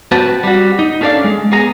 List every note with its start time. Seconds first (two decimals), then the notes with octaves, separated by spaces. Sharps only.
0.12 C4 F#4 B4 A5
0.43 G3 F#4
0.79 D#4
1.01 C#4 D4 A4 B4 D5 F5
1.24 G#3
1.52 B3 G#4 A#5